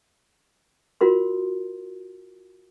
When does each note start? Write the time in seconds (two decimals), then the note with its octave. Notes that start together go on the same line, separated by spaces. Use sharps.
1.01 F4 F#4 A#4 C6